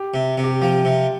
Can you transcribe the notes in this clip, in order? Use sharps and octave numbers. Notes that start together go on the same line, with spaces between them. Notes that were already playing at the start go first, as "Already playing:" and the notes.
Already playing: G4
C3
C3
G4
F3 G4
C3